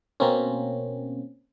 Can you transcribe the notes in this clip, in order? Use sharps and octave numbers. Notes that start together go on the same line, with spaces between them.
B2 A#3 C4 C#4